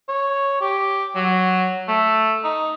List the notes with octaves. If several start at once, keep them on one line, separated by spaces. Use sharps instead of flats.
C#5
G4
F#3
A3
D#4